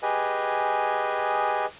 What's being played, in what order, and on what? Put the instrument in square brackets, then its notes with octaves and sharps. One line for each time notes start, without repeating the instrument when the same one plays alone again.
[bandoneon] G4 G#4 B4 D#5 G#5